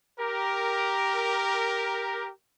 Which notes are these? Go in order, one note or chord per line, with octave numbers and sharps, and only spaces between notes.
G4 A#4